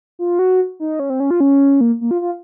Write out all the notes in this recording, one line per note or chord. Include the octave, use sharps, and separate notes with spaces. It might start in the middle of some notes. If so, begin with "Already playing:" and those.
F4
F#4
D#4
C#4
C4
C#4
F4
C#4
A#3
A#3
F4
F4